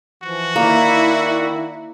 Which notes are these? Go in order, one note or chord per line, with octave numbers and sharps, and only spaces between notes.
E3 F3 F#4
D#3 A#3 E4 D5